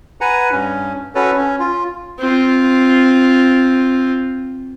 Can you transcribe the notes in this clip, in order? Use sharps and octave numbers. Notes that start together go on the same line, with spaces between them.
B4 F#5 G#5 A#5
G2 C#4
C#4 F#4 A4 B4 C#5
C#4
F4
C4 F4